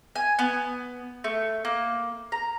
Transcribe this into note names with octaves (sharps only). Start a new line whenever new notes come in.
G#5
B3
A3
A#3
A#5